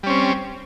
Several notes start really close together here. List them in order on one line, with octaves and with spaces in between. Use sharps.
G3 C#4 C4